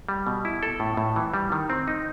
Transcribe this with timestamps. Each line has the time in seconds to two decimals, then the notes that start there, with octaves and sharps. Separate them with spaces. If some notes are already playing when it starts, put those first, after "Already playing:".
0.09 G3
0.27 B2
0.45 E4
0.63 A4
0.80 A2
0.97 A2
1.16 E3
1.34 G3
1.52 D#3
1.70 C4
1.88 D#4